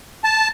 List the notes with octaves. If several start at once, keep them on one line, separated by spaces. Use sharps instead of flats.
A5